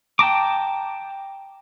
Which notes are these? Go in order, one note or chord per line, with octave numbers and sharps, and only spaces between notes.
G5 A5 A#5 D6